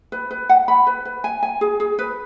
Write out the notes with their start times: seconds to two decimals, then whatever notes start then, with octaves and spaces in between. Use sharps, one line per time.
0.12 B4
0.31 B4
0.49 F#5
0.68 B5
0.87 B4
1.05 B4
1.24 G#5
1.43 G#5
1.61 G#4
1.80 G#4
1.99 B4